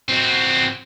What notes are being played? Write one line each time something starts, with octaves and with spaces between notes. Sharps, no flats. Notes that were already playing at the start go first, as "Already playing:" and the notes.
C4 F#4